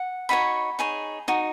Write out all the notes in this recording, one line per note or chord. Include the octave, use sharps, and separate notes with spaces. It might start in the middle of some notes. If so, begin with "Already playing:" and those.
Already playing: F#5
D#4 F#4 C#5 B5
D#4 G#4 C#5
D#4 F#4